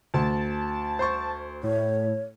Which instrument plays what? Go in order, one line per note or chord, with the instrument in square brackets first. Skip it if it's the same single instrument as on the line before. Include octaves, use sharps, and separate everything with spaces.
[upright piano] D2 [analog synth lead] A5
[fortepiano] C5 C6 C#6
[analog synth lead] A2 [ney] C#5